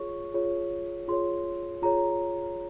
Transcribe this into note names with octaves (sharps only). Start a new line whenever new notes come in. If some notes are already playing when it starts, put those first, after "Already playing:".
Already playing: F4 G#4 C#5 C#6
F4 G#4 C#5
F4 G#4 C#5 C6
F4 G#4 C#5 A#5